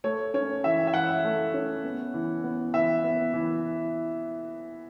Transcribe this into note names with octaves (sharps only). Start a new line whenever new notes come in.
A3 C#5
C#4 C#5
E3 E5
E5
E3 F#5
A3
C#4
B3
E3
B3
E3 E5
B3
E3